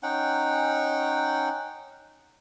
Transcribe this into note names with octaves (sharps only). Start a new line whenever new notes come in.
C#4 D#4 F#5 G5